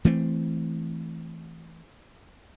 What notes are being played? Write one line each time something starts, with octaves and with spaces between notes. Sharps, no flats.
E3 A3 C4